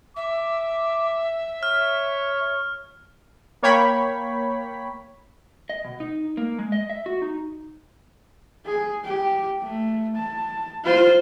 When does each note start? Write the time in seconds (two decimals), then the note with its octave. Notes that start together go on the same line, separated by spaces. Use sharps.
0.16 E5 D6
1.63 C#5 F6
3.63 A#3 C#5 G5 B5 B6
5.69 D#5
5.84 B2
6.00 D#4
6.37 A#3
6.58 G#3
6.72 D#5
6.89 E5
7.06 F#4
7.22 D#4
8.66 G#4
9.05 G4
9.62 A3
10.16 A5
10.85 F4 C5